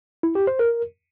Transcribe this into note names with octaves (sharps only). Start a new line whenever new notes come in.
E4
G4
C5
A#4